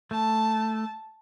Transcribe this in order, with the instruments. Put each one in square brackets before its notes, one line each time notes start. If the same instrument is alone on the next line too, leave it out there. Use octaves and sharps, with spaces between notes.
[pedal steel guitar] A3 [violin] A5